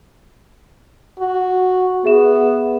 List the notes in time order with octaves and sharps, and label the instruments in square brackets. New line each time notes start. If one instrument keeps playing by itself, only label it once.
[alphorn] F#4
[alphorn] B3 [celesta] G#4 E5 E7